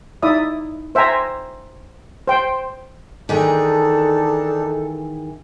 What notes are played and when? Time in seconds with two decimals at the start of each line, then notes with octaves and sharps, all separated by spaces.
0.22 D#4 E4 D5 E5 D#6
0.95 C5 E5 G5 G#5 A#5
2.28 C5 G5 C6
3.29 D#3 E3 D4 D#4 G#4 A4